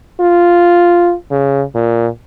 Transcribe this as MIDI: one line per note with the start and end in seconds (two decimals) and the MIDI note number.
0.21 1.14 65
1.31 1.62 49
1.75 2.07 46